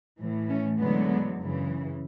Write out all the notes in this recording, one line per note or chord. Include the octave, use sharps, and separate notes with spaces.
A2 E3
A3 C#4
E2 D3 F#3 G#3 B3
F#2 C#3 E3